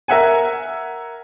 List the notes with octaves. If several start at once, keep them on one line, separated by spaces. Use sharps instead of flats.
A#4 E5 F#5 G#5